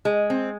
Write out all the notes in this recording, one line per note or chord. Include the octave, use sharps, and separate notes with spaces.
G#3
C4